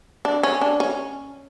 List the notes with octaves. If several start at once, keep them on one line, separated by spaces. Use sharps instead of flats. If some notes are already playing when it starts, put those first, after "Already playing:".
D4
C#4
D4
C#4